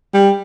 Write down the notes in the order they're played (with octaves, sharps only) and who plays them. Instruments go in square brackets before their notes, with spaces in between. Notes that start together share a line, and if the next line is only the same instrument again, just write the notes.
[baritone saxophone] G3